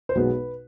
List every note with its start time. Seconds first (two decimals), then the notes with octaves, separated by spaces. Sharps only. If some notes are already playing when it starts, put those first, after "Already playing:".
0.09 C5
0.15 B1 B2 G#3 B3 B4